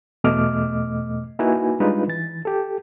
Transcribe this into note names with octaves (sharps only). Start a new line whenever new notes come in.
E2 B2 A3 D#5 D6 F6
A#3 D#4 E4 F#4 B4 G#5
G3 G#3 D4 D#4 F4 B4
E3 A6
G4 A4